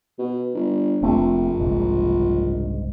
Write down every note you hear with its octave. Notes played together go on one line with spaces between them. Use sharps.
B2
G1
F1 A#1 A3 C4
F#1 C2 G#2